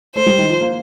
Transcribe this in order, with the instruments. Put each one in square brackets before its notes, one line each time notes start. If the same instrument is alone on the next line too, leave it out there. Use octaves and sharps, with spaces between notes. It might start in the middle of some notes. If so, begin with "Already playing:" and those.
[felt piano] A3 [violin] C5
[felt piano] G3
D#3
F3
A#3